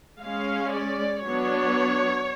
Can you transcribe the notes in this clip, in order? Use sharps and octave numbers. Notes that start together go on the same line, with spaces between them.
G#3 C#4 F5
D5
F#3 B3 D4 C#5